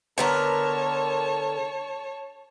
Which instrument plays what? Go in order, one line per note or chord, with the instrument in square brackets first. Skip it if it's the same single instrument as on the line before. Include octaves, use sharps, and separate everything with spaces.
[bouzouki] D3 B3 A#4 [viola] C#5 A5